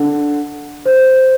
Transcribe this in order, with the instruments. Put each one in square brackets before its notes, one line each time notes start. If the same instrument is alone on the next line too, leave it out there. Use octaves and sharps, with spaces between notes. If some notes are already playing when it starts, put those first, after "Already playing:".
Already playing: [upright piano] D3 [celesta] A4
[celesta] C5